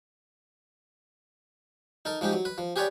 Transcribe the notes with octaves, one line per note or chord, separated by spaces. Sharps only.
D#4 A4 A#4
F3 G#3 D#4 G4
F#3
B4
F3
G4 G#4 B4 C#5 D5 G5